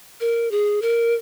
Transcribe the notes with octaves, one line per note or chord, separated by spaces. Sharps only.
A#4
G#4
A#4